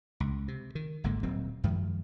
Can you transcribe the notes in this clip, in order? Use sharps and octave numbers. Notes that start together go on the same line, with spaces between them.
C#2
C3
D#3
G#1 G#2 D3 A#3
D1 A#2 F#3 C4
F#2 D#3 F3 G#3